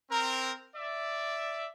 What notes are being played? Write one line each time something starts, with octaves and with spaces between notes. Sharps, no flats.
C4 A#4
D5 E5